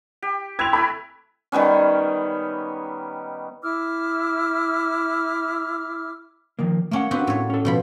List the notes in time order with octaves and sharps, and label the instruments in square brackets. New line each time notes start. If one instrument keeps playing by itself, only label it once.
[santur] G4
[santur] C4 E4 B4 [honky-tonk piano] G#6 F7
[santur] A3 E4 G#5 [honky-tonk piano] B5
[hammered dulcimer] D#3 G3 B3 C#4
[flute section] E4 D6 E6 F6
[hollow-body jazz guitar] D#3 F3 A#3
[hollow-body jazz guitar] A3 F#5 [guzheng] A#3 C#4
[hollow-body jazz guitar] B3 D4 B4 [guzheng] C4 F#4 G4
[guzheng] A2 C#5
[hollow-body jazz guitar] C#4 A4
[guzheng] B2 F3 B5